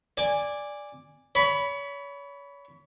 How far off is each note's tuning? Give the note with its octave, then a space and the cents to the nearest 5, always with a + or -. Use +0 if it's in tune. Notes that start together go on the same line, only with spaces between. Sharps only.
D5 +0 G#5 -15
C#5 +35 B5 +0